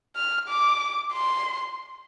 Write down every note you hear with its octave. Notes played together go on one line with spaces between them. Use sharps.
F6
D6
C6